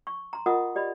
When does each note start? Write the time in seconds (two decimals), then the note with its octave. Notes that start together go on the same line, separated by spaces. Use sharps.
0.07 C#6
0.33 A#5 C6
0.46 F4 A#4 D#5 F#5 D#6
0.75 G4 D5 D#5 B5